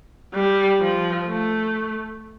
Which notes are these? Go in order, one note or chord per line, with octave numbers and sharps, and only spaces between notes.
G3
F3
A3